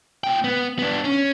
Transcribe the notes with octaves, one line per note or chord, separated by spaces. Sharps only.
A#2 G5
B3
B3 D4
C#4